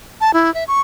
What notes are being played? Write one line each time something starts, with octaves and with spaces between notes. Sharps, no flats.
A5
E4
E5
C#6